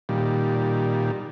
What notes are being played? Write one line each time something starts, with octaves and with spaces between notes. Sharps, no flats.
A#2 D#3 G3